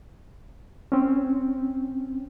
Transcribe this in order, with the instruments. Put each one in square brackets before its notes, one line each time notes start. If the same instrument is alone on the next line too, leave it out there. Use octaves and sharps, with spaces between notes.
[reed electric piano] C4 C#4